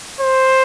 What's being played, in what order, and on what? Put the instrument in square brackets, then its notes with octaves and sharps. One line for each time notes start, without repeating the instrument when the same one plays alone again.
[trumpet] C5